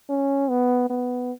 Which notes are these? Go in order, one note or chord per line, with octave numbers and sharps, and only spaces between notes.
C#4
B3
B3